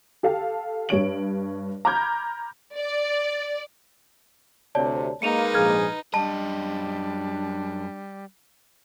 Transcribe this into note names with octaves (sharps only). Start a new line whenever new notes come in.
G4 A4 F5 A5
G2 G3 C#5 D7 F#7
A#5 B5 D6 F6 G6 G#6
D5
D2 C3 C#5 D5 A5
G#3 A#3 D#4 B4 C#7 D#7 F7
A#1 G#2 G#4 F6 G#6
F#2 G3 D4 D#5 A5